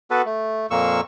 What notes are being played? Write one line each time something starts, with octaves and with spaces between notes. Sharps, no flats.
B3 F#4 A4 B4
A3
F2 A#2 A#3 C#6 E6